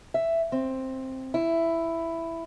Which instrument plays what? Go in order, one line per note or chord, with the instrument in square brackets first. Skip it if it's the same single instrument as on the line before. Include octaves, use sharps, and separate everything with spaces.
[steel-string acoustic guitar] E5
C4
E4